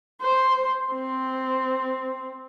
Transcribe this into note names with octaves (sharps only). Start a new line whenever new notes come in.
C5
C4